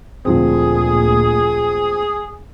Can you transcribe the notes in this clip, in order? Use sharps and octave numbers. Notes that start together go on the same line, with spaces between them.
D2 A#2 F3 C4 G#4